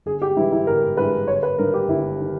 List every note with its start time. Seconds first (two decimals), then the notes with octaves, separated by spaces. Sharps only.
0.06 G1 G#4
0.22 G4
0.37 G2 E3 G#3 E4
0.52 E4
0.67 G1 A#4
0.97 G2 E3 G#3 B4
1.28 G1 C#5
1.43 B4
1.58 G2 D#3 A#4
1.73 G4
1.89 G1 E4
2.21 D#3